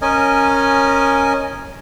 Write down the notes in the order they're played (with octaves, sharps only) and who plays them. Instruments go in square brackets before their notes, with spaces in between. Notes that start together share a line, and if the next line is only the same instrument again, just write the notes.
[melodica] C#4 A#4 D#5 G#5